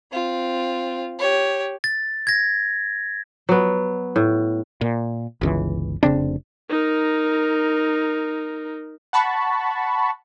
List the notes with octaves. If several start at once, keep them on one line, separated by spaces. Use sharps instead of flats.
C4 F4
G4 C#5
A6
G#6 A#6
F#3 B3
A2
A#2
G1 C#2 E3
F1 C#3 C4 D4
D#4 A#4
F#5 A5 B5 C#6